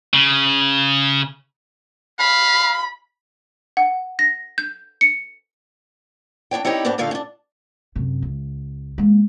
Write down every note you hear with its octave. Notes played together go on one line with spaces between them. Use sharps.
C#3
F5 B5
F#5
A#6
G6
C#7
D4 D#4 C#5 G5
C4 D#4 E4 G4 C#5 D#5
G#2 B3 C4 D4 G4
D#2 A#2 D3 A3 D#4 F5
C#4 D4
F#2 C3
C#2
G#3 A#3